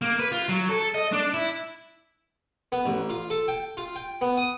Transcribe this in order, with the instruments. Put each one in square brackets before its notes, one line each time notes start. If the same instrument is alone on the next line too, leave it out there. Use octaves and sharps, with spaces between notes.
[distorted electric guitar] A#3
B4
F4
F#3
A4
D#5
D4
E4
[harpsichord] B3
A1
F4
A4
G5
F4
G5
B3
D#6